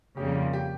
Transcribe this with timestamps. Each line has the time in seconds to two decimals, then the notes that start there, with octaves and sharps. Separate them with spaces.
0.17 F2 C#3 G3 A#3 G4
0.35 F4
0.53 G4